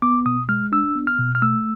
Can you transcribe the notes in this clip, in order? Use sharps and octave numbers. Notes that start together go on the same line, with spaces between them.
B3 D6
B2 D#6
G#3 F6
D4 E6
B3
F6
B2
F6
A3 E6